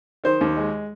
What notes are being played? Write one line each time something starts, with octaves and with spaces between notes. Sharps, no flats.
D#3 C5
D#2
G#3